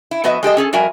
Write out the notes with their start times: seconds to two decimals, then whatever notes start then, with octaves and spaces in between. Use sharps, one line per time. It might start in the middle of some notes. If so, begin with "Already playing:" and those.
0.11 E4
0.24 F2 B3 F#4 B4 D#5 E5
0.43 G#3 G4 A4 D#5
0.57 C#4 G#4 A4
0.73 F2 G3 F#4 A#4 E5 G#5